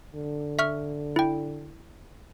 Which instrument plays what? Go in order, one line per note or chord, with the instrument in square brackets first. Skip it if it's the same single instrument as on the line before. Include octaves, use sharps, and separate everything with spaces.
[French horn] D3
[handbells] E5 C#6 F6
E4 G5